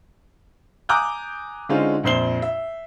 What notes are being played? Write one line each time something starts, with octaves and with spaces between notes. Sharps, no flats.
G#5 A#5 D6 D#6 F#6 G6
D3 G#3 C#4 D#4 F4 C5
A#1 F2 C5 C7 G7
E5